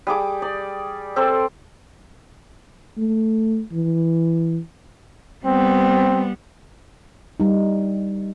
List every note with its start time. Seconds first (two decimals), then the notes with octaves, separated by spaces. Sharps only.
0.07 G3 G#4 D6
0.42 D5
1.16 C4 A4 D5 C6
2.98 A3
3.73 E3
5.45 G3 B3 C4
7.40 G3 D#4